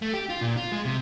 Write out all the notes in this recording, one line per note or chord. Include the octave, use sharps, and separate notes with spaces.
A3
G4
F4
A#2
F4
G#3
C3